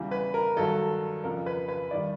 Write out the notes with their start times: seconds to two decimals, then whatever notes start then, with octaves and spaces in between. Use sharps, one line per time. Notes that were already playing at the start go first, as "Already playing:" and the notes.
Already playing: E2 C#3 E3 G3
0.11 B4
0.34 A#4
0.56 G2 D#3 F#3 A4
1.24 F2 C#3 F3 A#4
1.46 B4
1.68 B4
1.91 G2 D#3 G3 D5